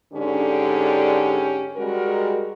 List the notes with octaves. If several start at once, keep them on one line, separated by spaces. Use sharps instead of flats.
G#2 D3 C#4 D4 G4
G3 G#3 F#4 A#4